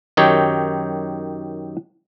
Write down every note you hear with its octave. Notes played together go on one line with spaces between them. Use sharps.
F#2 D#3 D#4 G4 C#5